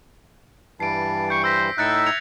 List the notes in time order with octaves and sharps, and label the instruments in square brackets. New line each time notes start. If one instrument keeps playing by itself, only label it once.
[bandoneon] G2 E3 G3 [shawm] A5 [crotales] C7 D7
[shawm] C#6 [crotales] G6 C7
[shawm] C5 [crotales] E6 A#6 B6
[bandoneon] A2 D#4 E6 [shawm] E5 [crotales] F#6 A6 C#7
[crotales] G#6 C#7 F7